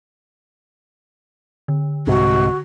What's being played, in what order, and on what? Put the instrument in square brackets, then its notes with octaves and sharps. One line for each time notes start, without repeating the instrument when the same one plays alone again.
[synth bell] D3
[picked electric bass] C2 G#2 C3 [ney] F#4